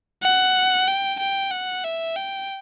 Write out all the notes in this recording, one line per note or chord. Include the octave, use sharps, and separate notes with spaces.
F#5
G5
G5
F#5
E5
G5